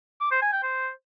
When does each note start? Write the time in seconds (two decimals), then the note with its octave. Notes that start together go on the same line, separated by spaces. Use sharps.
0.21 D6
0.31 C5
0.42 G#5
0.52 G5
0.63 C5